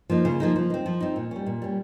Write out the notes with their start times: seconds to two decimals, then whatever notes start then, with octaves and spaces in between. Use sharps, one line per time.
0.10 F3 A#3 D#4
0.25 C#3
0.40 F3 A#3 D#4
0.56 F3
0.70 C4 D#4
0.86 F3
1.00 C4 D#4
1.16 A#2
1.31 G3 C#4
1.46 A#2
1.62 G3 C#4